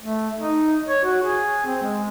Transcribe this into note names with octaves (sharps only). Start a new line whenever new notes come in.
A3
D#4
C#5
F#4
G#4
C4
G#3